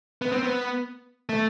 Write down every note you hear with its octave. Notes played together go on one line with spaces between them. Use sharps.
B3
C4
B3
A3